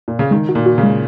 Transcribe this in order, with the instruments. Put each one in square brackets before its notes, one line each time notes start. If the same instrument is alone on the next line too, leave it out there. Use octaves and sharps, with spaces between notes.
[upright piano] A#2
C#3
[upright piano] D#3 [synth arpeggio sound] G#3
[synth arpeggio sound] F#4
[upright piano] A#2
[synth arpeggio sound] F#4
[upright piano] C#3
[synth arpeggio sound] G#3